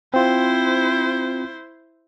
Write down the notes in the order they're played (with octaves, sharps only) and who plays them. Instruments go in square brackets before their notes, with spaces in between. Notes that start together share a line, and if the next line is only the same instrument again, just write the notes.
[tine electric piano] C4 F4 [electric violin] E4 C5